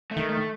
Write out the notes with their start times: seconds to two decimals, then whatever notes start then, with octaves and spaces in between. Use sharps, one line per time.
0.11 A3
0.17 D#3
0.30 A3